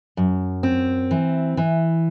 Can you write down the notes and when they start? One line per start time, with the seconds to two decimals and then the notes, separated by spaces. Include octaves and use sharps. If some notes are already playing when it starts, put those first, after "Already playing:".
0.17 F#2
0.63 C4
1.11 E3
1.57 E3